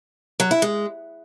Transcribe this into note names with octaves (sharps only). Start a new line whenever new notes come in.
F#3
E4
G#3